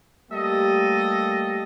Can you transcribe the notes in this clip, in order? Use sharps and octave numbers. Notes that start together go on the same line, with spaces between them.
G3 A3 A#3 G4 A4 D#5